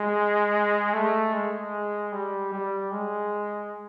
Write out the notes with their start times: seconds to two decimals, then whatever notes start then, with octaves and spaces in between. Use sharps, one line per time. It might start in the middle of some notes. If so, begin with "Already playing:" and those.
Already playing: G#3
0.93 A3
1.34 G#3
2.12 G3
2.52 G3
2.91 G#3